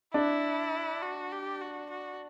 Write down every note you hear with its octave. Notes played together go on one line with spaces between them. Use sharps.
D4 E4
F#4
G4
F#4
F#4